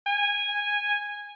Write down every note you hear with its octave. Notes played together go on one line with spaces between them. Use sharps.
G#5